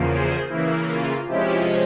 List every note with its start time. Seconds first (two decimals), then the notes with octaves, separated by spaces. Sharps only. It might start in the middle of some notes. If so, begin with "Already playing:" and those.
Already playing: E2 C#3 F3 A#3
0.10 G#4 C5
0.49 C#3 E3 A#3 E4
0.88 F4
1.27 C3 F3 G#3 C#4 E4 G4